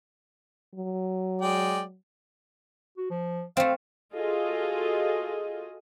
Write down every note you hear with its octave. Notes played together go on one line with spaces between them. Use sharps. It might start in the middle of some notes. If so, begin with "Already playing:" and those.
F#3
G#3 D5 G5
F#4
F3
A3 C4 F5
F4 F#4 G#4 A4 D#5